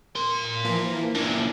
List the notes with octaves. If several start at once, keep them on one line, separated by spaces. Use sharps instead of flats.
A#4 C6
E3 F3 A#3
A#2 E3 D4